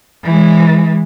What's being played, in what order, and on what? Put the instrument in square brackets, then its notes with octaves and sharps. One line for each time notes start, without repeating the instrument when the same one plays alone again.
[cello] E3 G#3